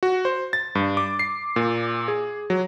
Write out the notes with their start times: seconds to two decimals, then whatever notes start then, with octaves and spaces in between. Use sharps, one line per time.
0.03 F#4
0.25 C5
0.53 A6
0.75 G2
0.97 D6
1.19 C7
1.56 A#2
2.08 G#4
2.50 F#3